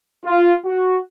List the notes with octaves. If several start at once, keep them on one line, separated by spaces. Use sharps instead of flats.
F4
F#4